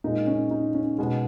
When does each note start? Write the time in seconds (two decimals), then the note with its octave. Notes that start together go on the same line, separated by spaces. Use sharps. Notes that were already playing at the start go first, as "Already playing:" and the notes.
0.04 A#2 G#3 D#4
0.27 C#4
0.51 D#4
0.75 C#4
0.98 B2 G#3 B3